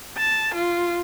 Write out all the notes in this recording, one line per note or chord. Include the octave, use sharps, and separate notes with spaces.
A5
F4